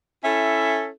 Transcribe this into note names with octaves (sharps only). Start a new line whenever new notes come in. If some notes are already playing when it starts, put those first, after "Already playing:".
C#4 E4 A4 E5